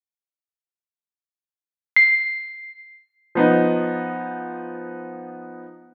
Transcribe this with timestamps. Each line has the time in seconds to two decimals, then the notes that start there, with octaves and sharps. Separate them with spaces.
1.96 C7
3.35 F3 B3 D#4